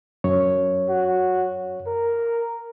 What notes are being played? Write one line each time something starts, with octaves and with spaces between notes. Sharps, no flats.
F#2 C#5
F#4
A#4